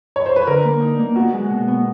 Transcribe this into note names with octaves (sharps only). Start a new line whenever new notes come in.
C#5
C5
B4
D3 A#4
A#3
D#4
A#3
B3 F#4
G#3
B2
B3